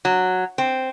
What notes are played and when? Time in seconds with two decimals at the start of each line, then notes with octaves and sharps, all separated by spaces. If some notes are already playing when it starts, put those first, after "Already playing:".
0.05 F#3
0.58 C4